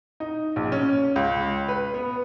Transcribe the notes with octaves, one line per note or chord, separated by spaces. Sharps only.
D#4
A#1
C#4
C#2
B4
B3